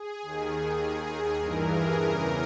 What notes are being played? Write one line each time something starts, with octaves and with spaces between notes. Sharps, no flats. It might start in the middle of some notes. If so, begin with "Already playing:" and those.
Already playing: G#4
D#2 D#3
D#2 D#3
G2 E3 A#4
G#4
E2 C#3 E3 A#4